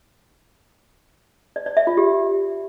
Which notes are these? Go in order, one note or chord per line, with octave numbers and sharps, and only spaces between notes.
D5
D5
E5
F4
G4